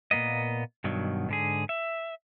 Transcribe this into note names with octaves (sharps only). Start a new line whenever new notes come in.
A#2 F3 A#3 B3 D#5
G2 B2 D#3 F#3
G#2 D3 G#4
E5